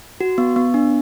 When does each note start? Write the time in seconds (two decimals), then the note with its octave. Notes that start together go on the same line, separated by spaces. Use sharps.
0.21 F#4
0.38 B3
0.56 B3
0.74 D4